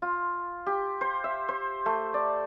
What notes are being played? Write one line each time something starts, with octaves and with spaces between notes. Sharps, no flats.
F4
G4
C5
E5
C5
A3
D5